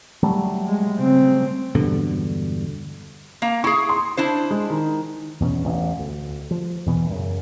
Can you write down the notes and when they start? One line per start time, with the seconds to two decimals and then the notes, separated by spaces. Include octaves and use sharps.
0.23 F#3 G3 A3
0.68 G#3
0.98 C#3 C4
1.75 E1 G2 B2 D3
3.42 A#3 A#5
3.64 E4 G#4 C#6
3.89 C6
4.17 D4 E4 C5
4.50 G#3
4.70 D#3
5.40 E2 B2 A3 C#4
5.64 A1 E2
5.99 D2
6.51 F3
6.86 E2 B2 E3
7.10 F#2 C#3